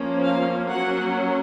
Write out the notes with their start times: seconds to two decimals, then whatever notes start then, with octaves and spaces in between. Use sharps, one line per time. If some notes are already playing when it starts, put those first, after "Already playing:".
Already playing: F3 A#3 C#4
0.23 F5
0.69 F#3 A#3 C#4 F#5